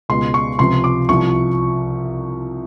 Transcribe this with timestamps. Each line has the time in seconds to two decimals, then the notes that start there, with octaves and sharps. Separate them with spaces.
0.09 C#2 B2 G#3 C6
0.34 C#6
0.59 C#2 C3 F3 C6
0.84 D6
1.09 C2 C3 F3 C#6